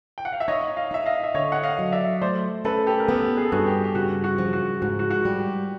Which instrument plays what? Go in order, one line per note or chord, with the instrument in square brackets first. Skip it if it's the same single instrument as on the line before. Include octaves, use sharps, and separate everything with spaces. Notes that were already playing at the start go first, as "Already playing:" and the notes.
[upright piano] G5
F#5
F5
E5
[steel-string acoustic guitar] D#4 [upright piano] C#5 D#5
[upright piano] D#5 F5
[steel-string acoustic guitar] D#4 [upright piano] E5
[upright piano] D#5 F5
E5
[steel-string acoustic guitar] D3 [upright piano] C#5 D#5
[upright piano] F#5
D#5 F5
[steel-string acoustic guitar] F#3
[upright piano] D5 E5
[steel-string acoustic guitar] A3 [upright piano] C5 D5
[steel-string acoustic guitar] C#4 [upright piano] A4 B4
[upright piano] G4 A4
A#4
[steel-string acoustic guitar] B3 [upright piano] G4 A4
[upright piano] G#4
A4
[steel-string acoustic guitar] G2 [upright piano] F#4 G#4
[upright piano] G4
G4
[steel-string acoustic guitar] C#3 [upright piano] F#4
[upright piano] F#4
[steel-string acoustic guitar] F3
[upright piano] F#4
[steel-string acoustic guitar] G#2 [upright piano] F#4
[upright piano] F#4
F#4
[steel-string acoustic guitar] G3
[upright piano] G4